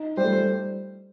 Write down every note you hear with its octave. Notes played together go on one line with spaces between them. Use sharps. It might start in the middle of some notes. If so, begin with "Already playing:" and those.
Already playing: D#4
G3 C5
A3
G3